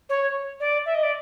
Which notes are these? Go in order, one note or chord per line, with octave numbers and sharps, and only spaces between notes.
C#5
D5
E5
D#5
D5